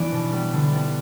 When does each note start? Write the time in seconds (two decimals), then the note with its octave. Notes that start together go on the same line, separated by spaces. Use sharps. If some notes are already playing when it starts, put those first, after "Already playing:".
Already playing: E3 B3 D4 D5
0.12 B2
0.32 G3 B3
0.53 D3
0.72 G3 B3 D4